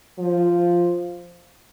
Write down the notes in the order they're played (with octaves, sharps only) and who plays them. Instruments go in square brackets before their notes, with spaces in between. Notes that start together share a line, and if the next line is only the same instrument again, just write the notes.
[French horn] F3